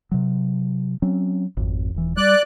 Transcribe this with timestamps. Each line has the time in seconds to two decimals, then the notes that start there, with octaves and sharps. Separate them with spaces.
0.12 C3 F#3
1.02 F#3 C4 C#4
1.57 G#1 F2
1.94 D#1 E3
2.17 G3 D5 F#6